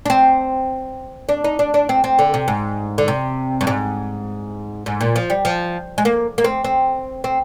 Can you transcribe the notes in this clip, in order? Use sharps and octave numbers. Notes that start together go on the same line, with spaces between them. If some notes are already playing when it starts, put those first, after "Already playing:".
D4
C4
D4
D#4
D4
D4
C4
C4
D3
C3
G#2
D3
C3
G2
G#2
G#2
A#2
F3
G3
F3
G#3
A#3
A#3
C4
C4
C4